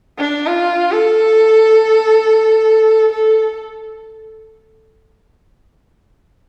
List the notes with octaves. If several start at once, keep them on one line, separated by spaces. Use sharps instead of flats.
D4
F4
A4
A4